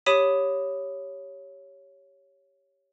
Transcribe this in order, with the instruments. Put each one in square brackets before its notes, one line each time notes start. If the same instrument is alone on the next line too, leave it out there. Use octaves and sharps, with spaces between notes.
[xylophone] G4 C#5 B5 D#6 B6 D#7